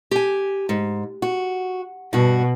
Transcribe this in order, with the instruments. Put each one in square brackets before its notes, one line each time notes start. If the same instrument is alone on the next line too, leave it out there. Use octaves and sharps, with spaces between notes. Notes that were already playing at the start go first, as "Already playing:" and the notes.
[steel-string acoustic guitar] G4 G#5
G#2
F#4
[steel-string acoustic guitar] G2 F#4 [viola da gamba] B2